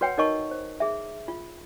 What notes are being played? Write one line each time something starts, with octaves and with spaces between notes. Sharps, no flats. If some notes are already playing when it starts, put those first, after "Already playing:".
F#4 B4 C#5 F#5 G5
D#4 A#4 C#5 D#5 A5 C#6
C5
G#4 E5
F4